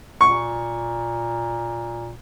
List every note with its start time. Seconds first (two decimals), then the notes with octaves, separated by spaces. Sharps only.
0.21 A#2 C#6